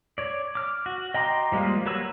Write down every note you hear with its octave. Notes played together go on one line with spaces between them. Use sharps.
C#5 D5
D6 F6
F#4
D#5 G5 A#5 C6 D6
F3 G3 G#3 A#3 F4
F#3 A#3 B4 C#5 E6